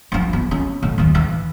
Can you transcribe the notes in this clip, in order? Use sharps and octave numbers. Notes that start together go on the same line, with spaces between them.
F3 E4
B3
C#4
A2
D#2 E3
E3